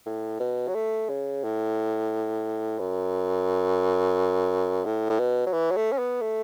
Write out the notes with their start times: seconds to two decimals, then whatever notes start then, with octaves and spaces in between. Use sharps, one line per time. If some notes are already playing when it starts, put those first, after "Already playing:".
0.06 A2
0.40 B2
0.68 F#3
0.75 A3
1.09 C#3
1.44 A2
2.79 F#2
4.85 A2
5.10 A2
5.20 B2
5.46 F#3
5.53 E3
5.71 F#3
5.76 A3
5.92 C#4
5.99 B3
6.21 A3